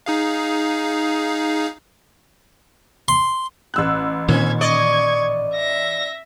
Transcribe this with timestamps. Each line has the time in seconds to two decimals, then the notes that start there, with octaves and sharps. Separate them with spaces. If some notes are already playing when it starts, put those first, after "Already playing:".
0.06 D#4 G#4 F5
3.08 C6
3.74 A1 E6 F#6
4.28 A#2 D#3 C4 C#4 G#6
4.61 D5 D#5 C#6 G#6
5.55 E5 A#6